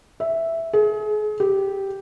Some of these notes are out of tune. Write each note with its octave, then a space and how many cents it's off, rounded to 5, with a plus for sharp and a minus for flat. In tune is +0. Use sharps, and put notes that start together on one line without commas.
E5 +0
G#4 +35
G4 -5